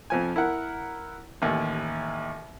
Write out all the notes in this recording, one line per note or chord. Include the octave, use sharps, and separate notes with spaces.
F2 F3 G#5
E4 A#4 F#5
A1 D#2